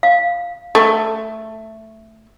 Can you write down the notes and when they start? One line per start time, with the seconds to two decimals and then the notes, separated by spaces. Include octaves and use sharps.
0.03 F5
0.75 A3